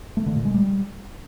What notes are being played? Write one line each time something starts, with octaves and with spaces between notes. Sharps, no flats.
A3
D3
A#2
G#3
G3